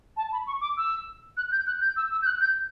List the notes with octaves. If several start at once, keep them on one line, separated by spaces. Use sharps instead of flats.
A5
B5
C#6
D6
E6
F#6
G6
F#6
G6
E6
E6
G6
F#6
G6